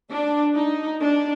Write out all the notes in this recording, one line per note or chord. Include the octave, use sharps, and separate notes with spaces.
D4
D#4
D4